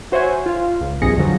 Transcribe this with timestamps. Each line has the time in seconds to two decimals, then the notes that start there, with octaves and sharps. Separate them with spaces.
0.12 F#4 C5 C#5 E5 F#5 G#5
0.46 F4 F5
0.81 C#2
1.02 A#1 G2 C3 G#4 A#6 C#7
1.17 F2 D3 F3 F#3